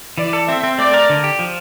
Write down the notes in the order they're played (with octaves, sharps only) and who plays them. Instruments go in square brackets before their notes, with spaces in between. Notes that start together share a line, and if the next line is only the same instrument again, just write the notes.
[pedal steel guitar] E3 [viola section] D5
[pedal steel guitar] A4
[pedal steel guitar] C4 [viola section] E5
[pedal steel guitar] C4
[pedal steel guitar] A3 [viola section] D5
[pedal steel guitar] A#4
D3
G4
F3